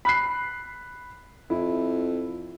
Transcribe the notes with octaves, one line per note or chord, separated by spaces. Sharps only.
B5 F#6 C7
F2 E4